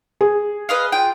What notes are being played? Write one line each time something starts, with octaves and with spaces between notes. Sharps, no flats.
G#4
B4 D#5 F5
F4 G5